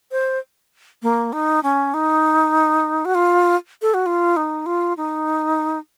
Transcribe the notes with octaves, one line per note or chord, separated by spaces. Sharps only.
C5
A#3
D#4
C#4
D#4
F#4
F4
A4
F#4
F4
D#4
F4
D#4